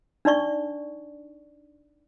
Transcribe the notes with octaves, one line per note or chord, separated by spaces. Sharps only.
D4 D#4 D5 C#6